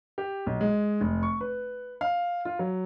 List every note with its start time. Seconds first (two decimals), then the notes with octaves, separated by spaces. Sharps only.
0.18 G4
0.46 B1
0.61 G#3
1.01 F1
1.23 C#6
1.41 B4
2.01 F5
2.45 F4
2.59 F#3